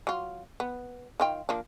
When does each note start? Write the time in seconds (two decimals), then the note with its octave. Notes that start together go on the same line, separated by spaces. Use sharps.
0.07 F#3 F4
0.60 B3
1.20 D#3 F4 G5
1.49 F3 A#3 D4